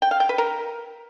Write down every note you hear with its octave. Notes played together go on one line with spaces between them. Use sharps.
G5
F5
G5
B4
A#4